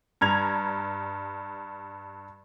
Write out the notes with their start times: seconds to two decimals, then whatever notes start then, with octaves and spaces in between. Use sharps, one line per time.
0.21 G2 A#5 G#6 F7